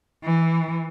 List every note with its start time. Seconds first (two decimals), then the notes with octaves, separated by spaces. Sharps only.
0.24 E3